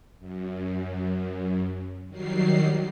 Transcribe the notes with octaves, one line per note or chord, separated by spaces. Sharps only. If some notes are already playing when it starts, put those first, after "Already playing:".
F#2
D#3 F#3 G3 C7